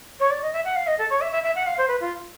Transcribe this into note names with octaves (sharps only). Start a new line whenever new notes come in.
C#5
D5
D#5
E5
F#5
F5
D#5
A4
C#5
E5
E5
E5
F#5
F5
C5
B4
F4